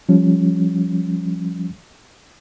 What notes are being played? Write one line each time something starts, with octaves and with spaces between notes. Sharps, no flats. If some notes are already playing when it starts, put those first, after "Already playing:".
F3 G3 C#4